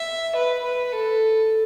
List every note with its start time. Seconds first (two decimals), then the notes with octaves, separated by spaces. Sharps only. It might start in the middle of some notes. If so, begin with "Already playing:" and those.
Already playing: E5
0.36 B4
0.64 B4
0.92 A4